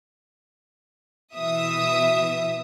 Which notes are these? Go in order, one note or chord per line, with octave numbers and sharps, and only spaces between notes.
B2 E3 E5 D#6